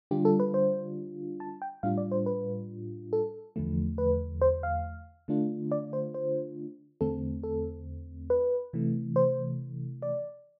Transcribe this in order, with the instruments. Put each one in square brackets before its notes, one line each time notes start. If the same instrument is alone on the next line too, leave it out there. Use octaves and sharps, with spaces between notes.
[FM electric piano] D3 G3 D4 F4 G4
A4
B4
C5
A5
G5
A2 G3 D4 F4 F5
D5
C5
B4
A4
E2 D3 F3 A3
B4
C5
F5
D3 A3 D4 F4
D5
C5
C5
E2 D3 A3 C4 A4
A4
B4
C3 E3 A3
C5
D5